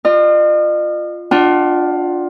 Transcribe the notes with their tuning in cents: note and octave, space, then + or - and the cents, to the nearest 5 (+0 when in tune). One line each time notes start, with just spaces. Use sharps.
F4 +0 D#5 -45
D4 +0 F4 +15 F#5 +35